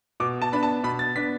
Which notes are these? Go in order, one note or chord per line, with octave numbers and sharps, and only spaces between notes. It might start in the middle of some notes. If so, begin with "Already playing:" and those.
B2 D6
A5
B3 D4 B5
A5
B2 B5
A6
B3 D4 B6